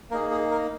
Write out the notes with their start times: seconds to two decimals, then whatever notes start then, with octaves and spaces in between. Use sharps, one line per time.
0.11 A#3 D#4 G#4 A#4
0.31 G#4
0.51 A#4